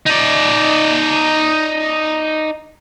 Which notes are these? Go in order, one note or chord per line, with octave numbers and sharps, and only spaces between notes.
D#4 D5